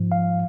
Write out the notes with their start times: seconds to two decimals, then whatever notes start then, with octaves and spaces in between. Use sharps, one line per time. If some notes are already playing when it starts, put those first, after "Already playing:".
Already playing: G#2 F3
0.12 F5